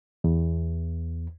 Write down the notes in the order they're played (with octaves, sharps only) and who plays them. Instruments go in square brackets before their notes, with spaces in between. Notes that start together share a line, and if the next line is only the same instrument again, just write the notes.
[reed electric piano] E2